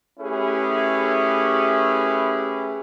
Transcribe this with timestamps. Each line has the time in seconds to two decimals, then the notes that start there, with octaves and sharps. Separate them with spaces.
0.20 A3 C#4 E4 G4 G#4 B4